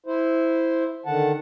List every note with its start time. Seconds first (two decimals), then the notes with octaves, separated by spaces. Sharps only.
0.06 E4 C5
1.06 D3 D#3 F#5 A5